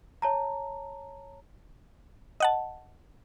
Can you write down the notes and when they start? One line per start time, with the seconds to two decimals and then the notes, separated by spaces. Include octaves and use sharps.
0.22 C#5 A5 A#5
2.40 D#5 F#5 A5